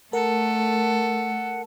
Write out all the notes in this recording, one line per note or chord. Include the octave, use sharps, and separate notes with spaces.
A3 A4 A#4 F#5